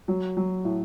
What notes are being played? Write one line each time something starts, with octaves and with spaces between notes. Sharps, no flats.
F#3
F#3
A2